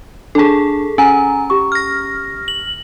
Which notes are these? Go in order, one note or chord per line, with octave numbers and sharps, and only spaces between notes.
D4 G#4 A4 A5
C#4 G#5 A#5
G4 C#6
F6 A#6
F#7